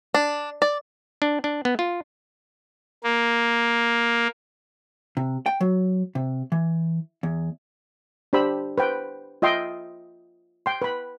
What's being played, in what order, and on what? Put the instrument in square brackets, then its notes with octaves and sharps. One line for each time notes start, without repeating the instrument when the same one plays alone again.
[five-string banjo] D4
D5
[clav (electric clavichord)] D4
D4
B3
F4
[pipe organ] A#3
[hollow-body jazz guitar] C3
G5
F#3
C3
E3
E2
[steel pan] D4 G4 C5 B5 E6
B4 C5 G5
F4 D#5 E5 G5 C6
G5 C6
B4 B5